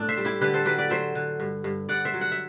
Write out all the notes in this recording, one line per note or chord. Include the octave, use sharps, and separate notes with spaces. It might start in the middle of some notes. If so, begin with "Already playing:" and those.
Already playing: A2 D4
C5 E5
G3
E4 G4
D3 G4 B4
A4 C5
F#3 G4 B4
B4 D5
F#3 C5 E5
D3
G2
G2
G2 D5 F#5
C5 E5
F#3
F#5
E5